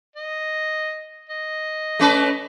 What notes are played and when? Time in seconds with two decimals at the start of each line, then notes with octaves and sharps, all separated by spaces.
0.16 D#5
1.29 D#5
1.99 A3 C#4 B4